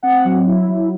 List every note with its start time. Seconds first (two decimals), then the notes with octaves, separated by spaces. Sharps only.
0.03 C4 F#5
0.25 F#3
0.47 E4
0.69 F#3